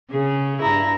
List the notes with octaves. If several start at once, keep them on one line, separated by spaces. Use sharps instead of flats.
C#3 G#4
G2 E4 A#5